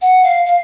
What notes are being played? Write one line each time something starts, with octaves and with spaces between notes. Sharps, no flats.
F#5
F5
F5